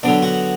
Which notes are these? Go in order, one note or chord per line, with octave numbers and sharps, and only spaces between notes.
D3 F#3 B3 D4 D5
F#4 F#5